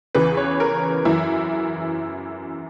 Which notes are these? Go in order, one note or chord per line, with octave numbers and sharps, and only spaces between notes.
E2 C#3 E3 B4
C#5
A#4
F#2 E3 E4